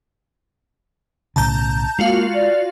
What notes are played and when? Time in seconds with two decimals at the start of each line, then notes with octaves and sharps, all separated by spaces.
1.36 B1 A2 C#3 A5 A#5 G6
1.99 G#3 A#3 F4 F#4 F5
2.34 D5